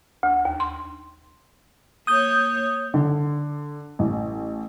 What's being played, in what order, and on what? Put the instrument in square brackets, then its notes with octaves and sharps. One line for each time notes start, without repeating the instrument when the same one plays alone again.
[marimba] D2
D#2
C6
[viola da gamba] A#3 C#5 [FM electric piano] D#6 G6
[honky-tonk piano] D3
A1